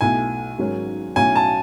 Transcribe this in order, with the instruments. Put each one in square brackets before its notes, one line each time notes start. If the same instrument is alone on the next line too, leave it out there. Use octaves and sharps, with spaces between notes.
[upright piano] B1 B2 A3 E4 [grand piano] G#5
[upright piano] G#1 G#2 F#3 C#4
[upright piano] B1 A2 F#3 C#4 E4 [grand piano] G#5
[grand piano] A5